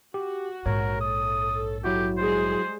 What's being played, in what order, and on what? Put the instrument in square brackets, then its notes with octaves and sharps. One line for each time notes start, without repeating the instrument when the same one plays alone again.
[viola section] F#4 [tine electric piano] G4
[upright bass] A#1 G#2 [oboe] A#4 [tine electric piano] C#5
[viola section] A4 [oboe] D#6
[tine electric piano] F#3 E4 F#4 [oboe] G4
[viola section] G3 G#3 G#4 [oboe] C5